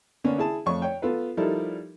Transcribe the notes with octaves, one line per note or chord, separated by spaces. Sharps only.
D3 A#3 B3 C#4 D4
E4 G#4 A5
F2 A3 C#5 C#6
C#5 G5
B3 F4 A4 B4
F3 G3 D#4 E4 A4 A#4